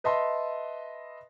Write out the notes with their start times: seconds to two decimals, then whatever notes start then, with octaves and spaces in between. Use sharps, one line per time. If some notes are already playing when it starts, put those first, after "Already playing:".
0.04 B4 D#5 E5 A5 C6